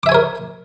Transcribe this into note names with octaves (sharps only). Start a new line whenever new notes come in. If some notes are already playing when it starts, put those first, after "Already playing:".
A#4 C#5 E5 G#5 D6